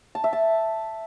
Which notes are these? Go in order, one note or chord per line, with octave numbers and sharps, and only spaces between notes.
A5
E5
A5